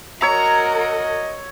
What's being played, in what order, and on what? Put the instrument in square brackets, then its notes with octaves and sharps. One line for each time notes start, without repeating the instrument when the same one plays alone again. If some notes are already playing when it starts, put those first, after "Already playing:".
[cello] F#4 A#4 [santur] C#5 E6 [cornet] D#5 [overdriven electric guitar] A#5